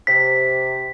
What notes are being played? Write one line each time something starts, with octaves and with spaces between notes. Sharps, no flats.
C3 B6